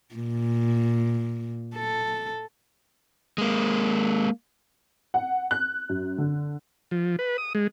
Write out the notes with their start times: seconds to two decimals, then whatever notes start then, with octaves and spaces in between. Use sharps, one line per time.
0.15 A#2
1.76 A4
3.38 G#3 A#3
5.14 F#5
5.51 F#6
5.89 F#2
6.18 D3
6.91 F3
7.19 B4
7.38 D#6
7.55 G#3